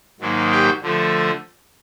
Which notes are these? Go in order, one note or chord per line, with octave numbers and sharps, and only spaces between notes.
G#2 D#3 F#3 A#3
G4 G5
D3 F3 A3